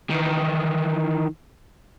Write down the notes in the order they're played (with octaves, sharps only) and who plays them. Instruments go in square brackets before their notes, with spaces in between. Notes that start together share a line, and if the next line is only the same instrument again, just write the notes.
[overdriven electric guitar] D#3 E3